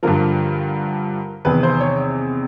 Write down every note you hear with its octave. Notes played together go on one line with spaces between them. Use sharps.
G2 D3 F3 A#4
E2 C3 D#3 B4
C5
C#5